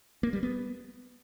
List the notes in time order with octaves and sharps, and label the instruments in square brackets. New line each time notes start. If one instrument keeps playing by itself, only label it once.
[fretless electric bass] A#3
G3
B3